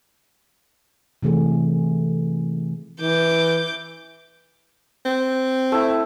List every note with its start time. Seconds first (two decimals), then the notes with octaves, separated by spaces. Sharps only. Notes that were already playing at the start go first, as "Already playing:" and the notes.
1.23 C3 E3 A3 G#4
3.01 E3 D6 G6
5.05 C4
5.72 A3 E4